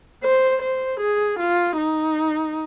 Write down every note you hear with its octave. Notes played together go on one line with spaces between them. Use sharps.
C5
C5
G#4
F4
D#4